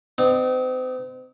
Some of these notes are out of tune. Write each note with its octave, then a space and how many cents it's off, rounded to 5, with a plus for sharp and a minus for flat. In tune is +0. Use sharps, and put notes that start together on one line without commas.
C4 -40 D#4 -25